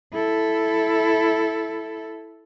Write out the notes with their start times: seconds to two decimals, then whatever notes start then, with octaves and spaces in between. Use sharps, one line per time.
0.13 E4 A4